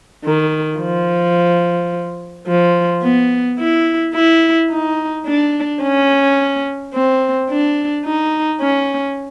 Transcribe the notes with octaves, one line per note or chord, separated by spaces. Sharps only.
D#3
F3
F3
B3
E4
E4
D#4
D4
C#4
C4
D4
D#4
C#4